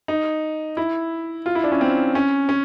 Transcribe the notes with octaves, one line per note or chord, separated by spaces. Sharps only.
D#4
E4
F4
E4
D4
C#4
C4
C#4
C#4